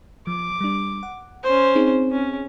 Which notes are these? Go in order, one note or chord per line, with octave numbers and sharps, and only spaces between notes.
F3 D6
G3 D4
F#5
C#4 C5 G6
C4 D#4 G#4
C#4